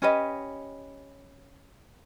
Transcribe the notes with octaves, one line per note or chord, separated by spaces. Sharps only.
C#4 G4 B4 D#5